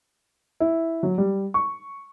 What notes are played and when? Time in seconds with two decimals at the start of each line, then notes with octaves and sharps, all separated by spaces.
0.60 E4
1.03 F#3
1.18 G3
1.54 C#6